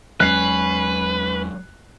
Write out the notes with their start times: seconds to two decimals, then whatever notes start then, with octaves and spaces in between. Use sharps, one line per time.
0.20 E2 F#3 G#3 C#4 B4 F#6 C7